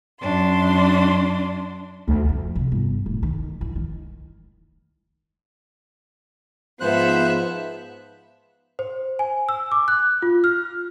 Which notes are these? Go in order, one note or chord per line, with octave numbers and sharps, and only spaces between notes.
F#2 D4 C6
D2
F2
C3
G1
D1
D#3
E3
D#3
G#2 F3 B3 C5 E5 F#6
C5
G#5
E6
D6
F#6
F4
F6